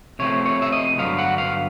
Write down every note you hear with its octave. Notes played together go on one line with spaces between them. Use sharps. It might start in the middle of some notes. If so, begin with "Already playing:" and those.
C3 F3 A3 C4 C#5
C#5
E5
D#5
G2 D3 F#3 B3 F5
F#5
F5